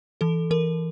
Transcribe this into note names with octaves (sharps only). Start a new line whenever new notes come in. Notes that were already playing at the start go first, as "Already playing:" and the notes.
E3 A4
E3 A#4